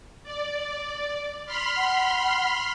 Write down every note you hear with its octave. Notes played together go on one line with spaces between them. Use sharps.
D5
B5 C6 F6
F#5